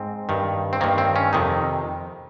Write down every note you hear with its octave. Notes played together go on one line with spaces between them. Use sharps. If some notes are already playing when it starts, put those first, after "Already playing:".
Already playing: G#2 C4
G2 D#3
C4
G2 D#3 A#3
C4
C#4
F2 C3 D#3 D#4